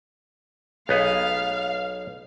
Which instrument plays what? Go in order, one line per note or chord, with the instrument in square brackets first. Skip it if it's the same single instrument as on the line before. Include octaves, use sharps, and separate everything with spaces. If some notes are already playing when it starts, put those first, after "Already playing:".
[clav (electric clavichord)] B1 B3 G#4 [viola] F5